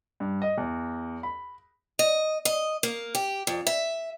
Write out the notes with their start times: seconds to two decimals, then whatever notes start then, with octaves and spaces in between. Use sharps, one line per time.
0.20 G2
0.42 D#5
0.58 E2
1.23 B5
1.99 D#5
2.45 D#5
2.83 A#3
3.15 G4
3.47 F2
3.67 E5